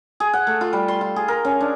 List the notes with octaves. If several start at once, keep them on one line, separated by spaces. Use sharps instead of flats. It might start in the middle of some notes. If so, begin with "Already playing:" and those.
G#4
F#5
A3
F4
G3
C6
F4
G#4
A#4
C#4
D4